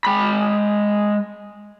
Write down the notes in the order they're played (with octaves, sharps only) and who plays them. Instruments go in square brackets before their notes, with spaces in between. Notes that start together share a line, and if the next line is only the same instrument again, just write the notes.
[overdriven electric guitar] G#3 B5